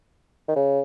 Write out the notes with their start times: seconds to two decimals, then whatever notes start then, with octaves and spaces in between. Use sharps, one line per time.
0.48 D#3
0.56 C#3